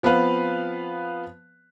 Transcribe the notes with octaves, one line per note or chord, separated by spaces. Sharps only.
F3 B3 C4 B4 F5